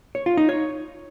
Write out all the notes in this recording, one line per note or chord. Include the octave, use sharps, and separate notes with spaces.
C#5
F4
D#4
C#5